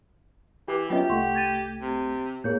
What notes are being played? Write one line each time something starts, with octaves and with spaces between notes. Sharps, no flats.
E3 G4 D6
F#3 B3 C#4 F4 G4 D#5 E5
C2 A3 F#5 C6 C#6
G#6 A6 D#7
C3
A2 A#3 G#4 C#5 G6